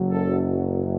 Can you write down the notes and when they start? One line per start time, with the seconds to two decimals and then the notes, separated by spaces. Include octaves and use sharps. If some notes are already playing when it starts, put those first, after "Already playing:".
Already playing: F#1 F#2 F#3
0.11 A4